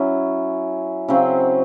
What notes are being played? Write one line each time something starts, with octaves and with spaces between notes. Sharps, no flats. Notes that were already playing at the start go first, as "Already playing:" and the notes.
Already playing: F#3 C#4 E4
C#3 F#3 C4